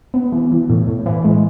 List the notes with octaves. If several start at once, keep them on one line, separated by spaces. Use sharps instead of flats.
B3
E3
E3
A2
A2
E3
G#3